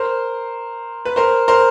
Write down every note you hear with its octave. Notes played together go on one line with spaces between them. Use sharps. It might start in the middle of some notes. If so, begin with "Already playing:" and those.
Already playing: A#4 C5
B4
A#4 C5
A#4 C5